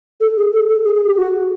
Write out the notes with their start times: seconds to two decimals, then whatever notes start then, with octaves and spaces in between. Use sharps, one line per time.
0.20 A4
0.37 G#4
0.53 A4
0.69 A4
0.84 G#4
0.95 G#4
1.06 G4
1.17 F#4